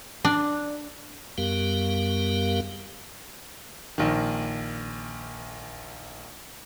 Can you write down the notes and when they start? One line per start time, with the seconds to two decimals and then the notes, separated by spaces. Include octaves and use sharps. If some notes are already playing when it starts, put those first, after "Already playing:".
0.25 D4
1.38 F#2 G3 B3 G4 A#4 F5
3.98 A#1 D#3